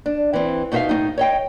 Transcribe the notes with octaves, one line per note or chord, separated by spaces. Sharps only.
D4
E3 C4
B2 D#4 F#4 C5 E5 F5
A2 C4 D#4
C#5 D#5 G5